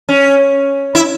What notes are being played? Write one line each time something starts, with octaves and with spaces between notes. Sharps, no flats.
C#4
E4